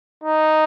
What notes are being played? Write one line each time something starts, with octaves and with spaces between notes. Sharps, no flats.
D#4